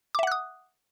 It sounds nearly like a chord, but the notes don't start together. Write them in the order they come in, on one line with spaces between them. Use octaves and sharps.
D6 E5 F#5 F#6 D#6